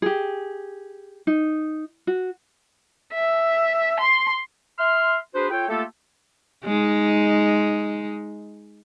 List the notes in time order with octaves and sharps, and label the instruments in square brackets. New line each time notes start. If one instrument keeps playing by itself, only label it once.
[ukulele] G4 G#4
D#4
F#4
[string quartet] E5
C6
[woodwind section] E5 C6 F6
D4 F#4 G#4 B4 C5
F4 A4 C#5 G5
A3 A#3 F4 G4 A4
[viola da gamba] G#3 D#4